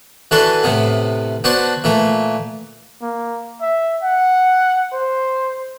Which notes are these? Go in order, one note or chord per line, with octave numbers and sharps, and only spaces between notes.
E3 D4 F#4 A4 B4
A2 C3 B3
B3 D4 F#4 C5 A5
A#2 E3 A3
A#3
E5
F#5
C5